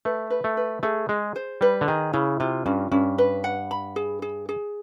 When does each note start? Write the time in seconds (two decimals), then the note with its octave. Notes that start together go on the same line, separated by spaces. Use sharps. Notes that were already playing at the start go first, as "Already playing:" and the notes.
0.05 A3 B4
0.30 B4
0.44 A3
0.57 B4
0.83 A3 G#4
1.09 G#3 G#4
1.36 C5
1.61 G3 B4
1.81 D3
1.88 D#3 G#4
2.13 C#3 E4
2.40 C3 F4
2.66 G2 C#4
2.92 G2 C#4
3.18 B4
3.44 F#5
3.71 B5
3.96 G#4
4.22 G#4
4.49 G#4